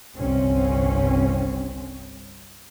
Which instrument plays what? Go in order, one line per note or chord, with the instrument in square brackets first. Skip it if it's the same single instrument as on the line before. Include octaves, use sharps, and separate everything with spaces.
[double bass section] G1 C2 G3 C4 C#4